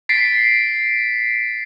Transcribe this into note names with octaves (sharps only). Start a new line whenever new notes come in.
A6 B6 C7 D7